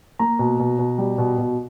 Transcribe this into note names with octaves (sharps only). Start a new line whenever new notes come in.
A#3 A#5
B2
B2
B2
G3
B2
B2